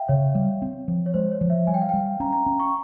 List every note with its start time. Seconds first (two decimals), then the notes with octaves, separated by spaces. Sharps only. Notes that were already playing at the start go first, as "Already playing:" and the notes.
Already playing: E5 F5 G5
0.09 C#3 C#5
0.35 G3
0.62 C4
0.88 F3
1.06 C#5
1.14 G#3 C5
1.32 C#5
1.41 F3
1.50 E5
1.67 G3 G#5
1.74 G5
1.82 F5
1.89 G3 G5
2.20 C#4 A#5
2.33 A#5
2.46 C#4
2.60 C#6